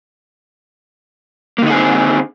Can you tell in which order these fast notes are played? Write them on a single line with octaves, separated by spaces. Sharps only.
A#3 D3 D#4 G#4 C4